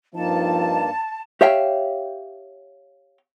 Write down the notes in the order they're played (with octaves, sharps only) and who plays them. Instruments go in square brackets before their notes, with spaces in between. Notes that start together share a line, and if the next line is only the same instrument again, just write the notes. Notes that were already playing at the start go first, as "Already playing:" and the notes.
[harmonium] G2 A#3 [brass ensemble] F3 C4 D#4 [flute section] A5
[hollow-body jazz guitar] G4 C#5 E5 F5 G5